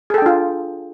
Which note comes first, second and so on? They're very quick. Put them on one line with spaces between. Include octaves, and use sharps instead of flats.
G#4 A4 G5 D4 F4